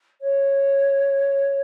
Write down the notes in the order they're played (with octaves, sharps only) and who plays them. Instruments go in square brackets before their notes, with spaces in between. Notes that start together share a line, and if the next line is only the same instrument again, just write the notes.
[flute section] C#5